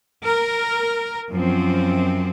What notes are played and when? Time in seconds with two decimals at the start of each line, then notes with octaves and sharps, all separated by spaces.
0.24 A#4
1.31 F#2 F3 C4